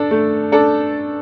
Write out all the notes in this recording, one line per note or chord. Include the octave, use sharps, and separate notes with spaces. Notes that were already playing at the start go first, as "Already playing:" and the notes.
Already playing: D4 A4
A3
D4 A4